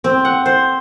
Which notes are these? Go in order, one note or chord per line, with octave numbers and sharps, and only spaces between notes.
C4
F#5
C5